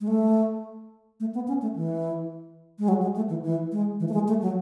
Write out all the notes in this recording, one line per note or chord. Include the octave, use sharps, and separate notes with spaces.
G#3
A3
A3
B3
C#4
A3
E3
G#3
F#3
G#3
A3
E3
E3
G#3
E3
A3
G#3
A3
F#3